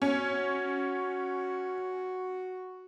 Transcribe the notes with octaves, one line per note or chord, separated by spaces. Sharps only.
C#4 F#4